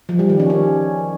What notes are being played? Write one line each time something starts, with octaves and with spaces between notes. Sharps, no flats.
F3
G3
D#3
C#4
C#4